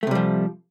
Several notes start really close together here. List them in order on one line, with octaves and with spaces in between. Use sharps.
A3 C3 G3 F3